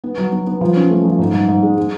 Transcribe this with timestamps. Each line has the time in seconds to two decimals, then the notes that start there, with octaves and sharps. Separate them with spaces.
0.04 B3
0.18 F#3
0.32 B3
0.47 B3
0.61 F3
0.76 C#4
0.90 A3
1.05 F3
1.19 G#2
1.34 G#2
1.48 G#2
1.63 G#3
1.77 G#3